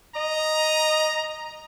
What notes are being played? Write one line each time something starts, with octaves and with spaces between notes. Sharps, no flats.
D#5 A#5